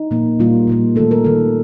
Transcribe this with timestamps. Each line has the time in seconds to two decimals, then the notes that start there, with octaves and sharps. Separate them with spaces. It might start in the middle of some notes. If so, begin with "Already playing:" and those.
Already playing: D#4
0.11 A#2 F3 A#3
0.39 A#2 G3 A#3 F4
0.67 A#2 G3 A#3
0.96 D#3 A3 A4
1.11 A#4
1.24 D#3 A3 A4